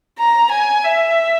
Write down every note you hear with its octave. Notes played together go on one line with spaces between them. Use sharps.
A#5
G#5
E5